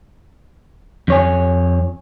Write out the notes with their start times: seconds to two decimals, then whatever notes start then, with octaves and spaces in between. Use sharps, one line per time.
1.08 F2 C#5 G#5